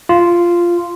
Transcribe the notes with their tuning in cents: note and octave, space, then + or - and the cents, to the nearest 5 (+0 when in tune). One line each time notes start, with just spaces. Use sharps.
F4 -10